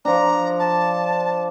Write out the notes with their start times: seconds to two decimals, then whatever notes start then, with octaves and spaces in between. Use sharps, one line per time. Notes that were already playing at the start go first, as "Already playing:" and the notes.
0.05 F3 D4 A#5
0.59 A5